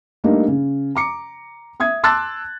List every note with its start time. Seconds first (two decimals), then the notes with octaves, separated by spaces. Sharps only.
0.24 G3 A3 A#3 D4 D#4
0.48 C#3
0.95 A#5 D6 C#7
1.80 E5 D#6 G#6
2.04 A5 C6 D6 E6 F#6 A6